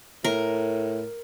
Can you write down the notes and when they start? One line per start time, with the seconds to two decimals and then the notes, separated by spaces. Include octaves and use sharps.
0.24 A2 A#4